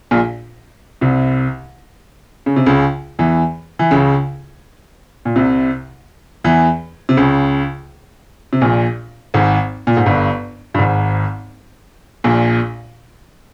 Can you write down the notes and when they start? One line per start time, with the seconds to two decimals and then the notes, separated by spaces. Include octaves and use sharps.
0.11 A#1 A#2
1.01 C2 C3
2.46 C#3
2.56 C3
2.66 C#2 C#3
3.19 E2 E3
3.79 E3
3.91 C#2 C#3
5.25 A#2
5.36 C2 C3
6.44 E2 E3
7.09 C3
7.17 C#2 C#3
8.53 C3
8.61 A#1 A#2
9.34 G#1 G#2
9.87 A#2
9.97 G#2
10.06 G1 G2
10.74 G2
10.79 G#1 G#2
12.24 A#1 A#2